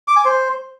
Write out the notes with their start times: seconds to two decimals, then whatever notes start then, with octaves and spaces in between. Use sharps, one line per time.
0.08 D6
0.16 G#5
0.25 C5